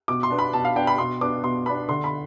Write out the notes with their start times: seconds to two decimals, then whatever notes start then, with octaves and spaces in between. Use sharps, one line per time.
0.08 B2 D6
0.23 C6
0.30 B3 D4
0.39 B5
0.53 B2 A5
0.65 F5
0.75 B3 D4 G5
0.87 B5
0.98 B2 C6
1.21 B3 D4 D6
1.44 B2 C6
1.66 B3 D4 B5
1.89 D3 C6
2.04 B5